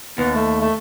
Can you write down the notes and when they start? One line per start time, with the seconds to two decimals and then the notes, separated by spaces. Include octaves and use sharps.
0.18 D#2 B3
0.34 A3
0.61 A3